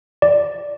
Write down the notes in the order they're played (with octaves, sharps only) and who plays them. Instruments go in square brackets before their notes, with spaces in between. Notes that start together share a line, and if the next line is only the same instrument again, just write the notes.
[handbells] D5